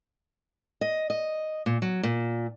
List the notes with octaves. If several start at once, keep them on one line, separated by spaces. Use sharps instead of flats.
D#5
D#5
A#2
F#3
A#2